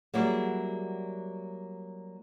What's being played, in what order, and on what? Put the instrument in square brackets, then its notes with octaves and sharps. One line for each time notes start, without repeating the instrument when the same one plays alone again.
[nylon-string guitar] F#3 G3 A#3 E4 G#4